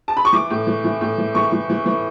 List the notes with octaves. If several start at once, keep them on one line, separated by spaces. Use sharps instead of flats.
A5
B5
C#6
E3 D6
A2
E3
E3
A2
E3
E3 C#6
E3
E3
E3